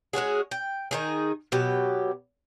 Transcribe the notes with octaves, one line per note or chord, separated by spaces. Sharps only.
G#3 C#4 F#4 G#4
G5
D#3 D#4 G#4
B2 F#3 G4